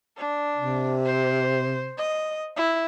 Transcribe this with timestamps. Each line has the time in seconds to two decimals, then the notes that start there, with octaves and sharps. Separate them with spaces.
0.17 D4
0.57 C3
1.05 C5
1.98 D#5
2.56 E4